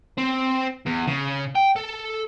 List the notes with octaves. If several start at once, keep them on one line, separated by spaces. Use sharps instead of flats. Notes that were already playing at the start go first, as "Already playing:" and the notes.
C4
E2
C#3
G5
A4